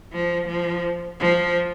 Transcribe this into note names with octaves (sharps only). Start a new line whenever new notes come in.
F3
F3
F3